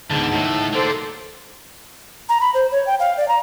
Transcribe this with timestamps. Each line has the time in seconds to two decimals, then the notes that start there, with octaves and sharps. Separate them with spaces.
0.10 D2 G#2 D3 B3 A5
0.32 C#2 A2 D#3 F#3
0.73 A#3 A4 C5 D5
2.29 A#5
2.41 B5
2.54 C5
2.72 C#5
2.87 G5
3.00 F5
3.17 D5
3.28 A#5